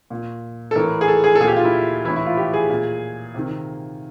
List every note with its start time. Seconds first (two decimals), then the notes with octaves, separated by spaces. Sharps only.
0.10 A#2
0.71 A4
0.75 A2 E3 A#4
1.01 G#4
1.08 A4
1.24 G#4
1.35 A4
1.40 A#2 G#4
1.48 G4
1.56 F4
1.64 E4
2.05 E3 E4
2.08 A2
2.16 E4
2.26 F4
2.37 G4
2.53 G#4
2.69 A#2
3.34 C3 D#3